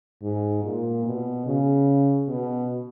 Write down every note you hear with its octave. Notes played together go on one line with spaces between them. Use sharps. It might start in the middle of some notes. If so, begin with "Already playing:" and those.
G#2
A#2
B2
C#3
B2